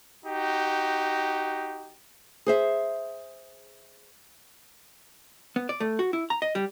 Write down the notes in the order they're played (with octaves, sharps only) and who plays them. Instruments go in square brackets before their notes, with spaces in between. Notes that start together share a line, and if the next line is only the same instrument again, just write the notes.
[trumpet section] D#4 F#4 G4
[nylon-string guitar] G#4 C5 E5
[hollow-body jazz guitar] B3
D5
A3
F#4
E4
A#5
D#5
G3